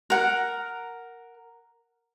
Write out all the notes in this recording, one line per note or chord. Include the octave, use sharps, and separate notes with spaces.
A#4 F#5